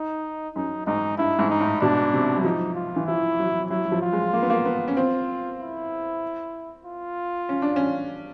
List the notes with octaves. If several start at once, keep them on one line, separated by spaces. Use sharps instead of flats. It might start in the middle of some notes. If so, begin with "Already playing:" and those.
Already playing: D#4
F#2 D#4
G#2 D#4
G2 E4
G#2
D#4
A2
B2 D4
C3
F#3
F3 D#4
F4
E3
F3 E4
F#3
F#3 E4
F#3
F3
F4
G#3
A#3
B3
A#3
B3
C#4
C4 F4
E4
F4
C#4
D4
C#4